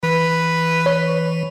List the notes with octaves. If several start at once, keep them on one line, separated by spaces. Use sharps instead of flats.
E3 B4
C#5